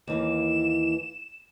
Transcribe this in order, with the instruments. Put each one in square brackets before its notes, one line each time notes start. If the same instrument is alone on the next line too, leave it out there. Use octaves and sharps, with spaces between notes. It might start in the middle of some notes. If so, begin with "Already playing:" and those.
[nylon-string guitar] D#2 E3 A#3 [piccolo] E7